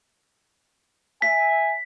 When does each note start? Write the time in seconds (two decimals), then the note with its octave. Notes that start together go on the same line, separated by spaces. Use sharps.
1.22 E5 G#5 B6